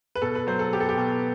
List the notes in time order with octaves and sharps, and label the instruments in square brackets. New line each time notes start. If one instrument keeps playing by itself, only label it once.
[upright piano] B4
B2 A4
B4
F#3 C5
A4
B3 G4
A4
G4
B2